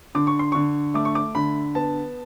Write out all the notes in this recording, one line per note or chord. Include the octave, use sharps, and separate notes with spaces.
D3 D6
C#6
C6
D3 C#6
A3 D6
C#6
D6
D3 B5
B3 A5